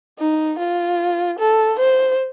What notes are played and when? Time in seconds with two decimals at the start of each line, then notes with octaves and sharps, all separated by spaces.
0.19 D#4
0.59 F4
1.39 A4
1.79 C5